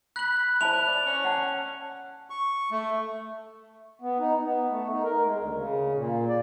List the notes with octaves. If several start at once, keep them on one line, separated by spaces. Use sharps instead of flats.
B5 F#6 F#7
E4 C5 A5 B5 F7
D5
C#4
F#5 A5
C#6
A3
B3
D#4
B3
A3
D#4
A#4
G#3
D2
C#3
A#2
D5